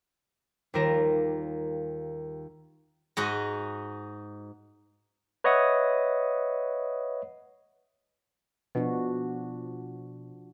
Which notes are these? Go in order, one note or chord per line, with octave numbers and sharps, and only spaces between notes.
D#2 G3 F4 A#4 A#6 E7
G#2 D#4 F#4
B4 C#5 D#5 E5 F#5 D#6
B2 F3 D4 F#4